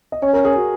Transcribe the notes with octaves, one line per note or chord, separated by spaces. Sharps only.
D#5
C#4 C#5
A#4
G#4
F#4